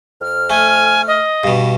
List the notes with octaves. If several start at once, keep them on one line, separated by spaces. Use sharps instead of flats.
F2 F6
A3 G#5
D#5
G2 B2